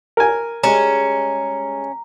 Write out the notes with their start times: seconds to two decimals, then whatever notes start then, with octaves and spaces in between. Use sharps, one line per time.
0.17 A#4 G#5
0.64 G3 G#3 C#4 A#5